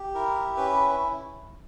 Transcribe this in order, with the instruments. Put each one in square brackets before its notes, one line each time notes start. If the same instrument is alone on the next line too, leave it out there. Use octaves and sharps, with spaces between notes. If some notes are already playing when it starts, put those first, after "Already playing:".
Already playing: [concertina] G4
E4 A#4
C#4 B4